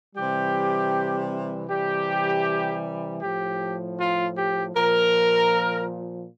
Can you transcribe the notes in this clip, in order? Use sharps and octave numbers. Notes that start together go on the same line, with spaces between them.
C3 E3 G3 G4
C3 E3 G3 G4
A2 F3 G4
F4
G4
A#2 F3 A#4